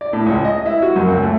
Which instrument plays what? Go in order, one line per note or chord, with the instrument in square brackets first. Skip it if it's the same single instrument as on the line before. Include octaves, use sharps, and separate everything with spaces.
[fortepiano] D5
A2
C#2
D#5
E4
F#4
F#2
C#2
A3